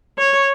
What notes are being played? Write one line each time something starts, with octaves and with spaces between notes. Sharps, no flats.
C#5